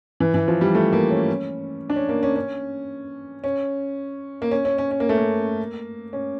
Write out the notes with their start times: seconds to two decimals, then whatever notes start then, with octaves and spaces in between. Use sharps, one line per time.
0.20 E3
0.34 E3
0.48 F3
0.61 G3
0.75 A3
0.93 A#3
1.11 C#4
1.90 D4
1.96 C#4
2.09 A#3
2.23 C#4
2.36 C#4
3.44 C#4
4.42 A#3
4.51 C#4
4.65 C#4
4.78 C#4
4.91 C#4
5.00 A#3
5.09 A3
5.18 A#3
6.13 C#4